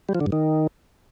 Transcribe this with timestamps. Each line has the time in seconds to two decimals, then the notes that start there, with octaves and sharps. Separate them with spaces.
0.09 G3
0.15 F3
0.20 D3
0.26 G2
0.32 D#3